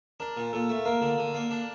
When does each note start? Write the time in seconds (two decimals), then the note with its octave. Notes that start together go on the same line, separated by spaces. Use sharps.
0.20 D4 A#4
0.37 A#2
0.53 A#2 A4
0.69 A3
0.76 A4
0.85 A#3 A#4
1.01 D3
1.18 D3
1.34 A#3
1.51 D4